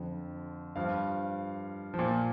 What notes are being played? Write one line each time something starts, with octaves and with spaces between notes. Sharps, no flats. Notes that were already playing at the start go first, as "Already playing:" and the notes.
Already playing: F2 D3 F3
G2 F3 F5
F3
A#2